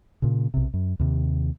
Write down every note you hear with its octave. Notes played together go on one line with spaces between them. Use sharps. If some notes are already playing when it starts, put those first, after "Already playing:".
A#2 C#3
B1 C3
F#2
D#2 C3